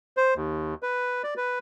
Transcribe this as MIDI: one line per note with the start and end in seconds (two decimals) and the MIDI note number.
0.17 0.34 72
0.36 0.74 39
0.83 1.22 71
1.24 1.34 74
1.37 1.59 71